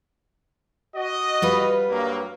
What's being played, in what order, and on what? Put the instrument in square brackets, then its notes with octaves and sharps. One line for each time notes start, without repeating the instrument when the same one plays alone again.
[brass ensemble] F#4 D#5
[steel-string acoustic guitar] G3 F4 B4
[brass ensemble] G2 F#3 A#3